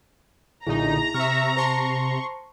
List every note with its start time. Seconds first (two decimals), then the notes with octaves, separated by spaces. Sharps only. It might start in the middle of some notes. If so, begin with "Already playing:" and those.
0.67 B1 A#2 D3 D#4 E4 G#4 A#5
1.14 C3 E5 C#6 F6
1.57 C5 A5 C6 C#6